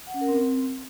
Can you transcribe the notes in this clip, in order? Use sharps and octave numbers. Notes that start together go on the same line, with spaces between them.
F#5
C#4
A#4
C4